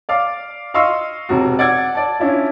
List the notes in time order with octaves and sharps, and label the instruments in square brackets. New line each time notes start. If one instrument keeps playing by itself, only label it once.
[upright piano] D5 F5 D6
D#5 F5 C6 C#6 E6
E1 C3 F#4
D5 F#5 E6 G#6
D5 A5
C#4 D4 E4 F4